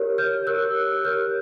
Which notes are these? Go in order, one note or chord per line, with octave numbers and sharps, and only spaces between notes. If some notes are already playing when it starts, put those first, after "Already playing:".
Already playing: G4 A#4 C#5
F6 G6
G4 A#4 C#5 E6 F#6
G4 A#4 C#5 F6 G6